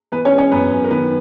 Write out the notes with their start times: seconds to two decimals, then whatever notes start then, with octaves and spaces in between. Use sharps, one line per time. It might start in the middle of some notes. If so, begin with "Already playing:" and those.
0.12 E3 B3 B4
0.25 C#4 C#5
0.32 G#3
0.38 C#4 C#5
0.51 F#2 B3 B4
0.70 F#2
0.84 A#4
0.91 D#3 B3 B4